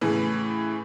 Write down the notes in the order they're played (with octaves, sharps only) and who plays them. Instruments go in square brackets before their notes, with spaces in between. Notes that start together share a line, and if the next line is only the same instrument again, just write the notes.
[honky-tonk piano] A2 C#3 E3